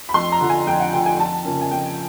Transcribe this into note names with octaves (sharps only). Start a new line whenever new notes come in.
B5
F2 C6
A#5
D3 F3
G#5
F2 G5
F#5
D3 F3 G5
G#5
F2 A5
C#3 F3 A#3 C#4
G#5
F2 G5